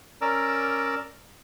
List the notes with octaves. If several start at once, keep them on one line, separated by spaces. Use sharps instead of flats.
C#4 A#4 D5 A#5 D6 E6